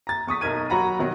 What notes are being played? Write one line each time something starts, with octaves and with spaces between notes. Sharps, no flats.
A#5 A6
E2 C#6 D#6 B6
B1 D#4 A#4 G#6 D#7
F#3 F#4 F#5 A#5 B5
B2 D#3 F#3